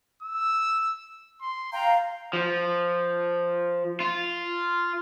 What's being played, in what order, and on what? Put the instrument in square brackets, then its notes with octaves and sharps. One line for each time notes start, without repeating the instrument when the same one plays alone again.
[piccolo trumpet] E6
C6
[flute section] F5 A#5 [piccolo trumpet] G5
[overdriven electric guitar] F3
F4